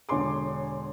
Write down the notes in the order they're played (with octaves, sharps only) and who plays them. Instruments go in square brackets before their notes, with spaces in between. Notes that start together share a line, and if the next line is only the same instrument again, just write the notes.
[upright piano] E1 D3 C#5 G#5 C6 D6